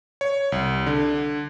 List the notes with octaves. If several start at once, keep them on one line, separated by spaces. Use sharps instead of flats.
C#5
C2
D3